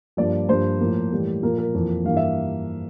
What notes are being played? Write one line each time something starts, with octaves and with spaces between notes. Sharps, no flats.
G2 F3 A#3 D5
G2 F3 A#3 C5
A2 F3 A#3
A2 E3 G3 A#3
A#2 F3 A#3 A#4
A#4
F2 E3 A#3
G2 E3 A#3 F5
E5